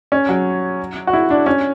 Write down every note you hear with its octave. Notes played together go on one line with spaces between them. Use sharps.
C#4
F#3
F#4
E4
D4
C#4